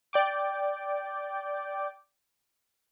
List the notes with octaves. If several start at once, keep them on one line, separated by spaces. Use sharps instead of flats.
D5 G5 D6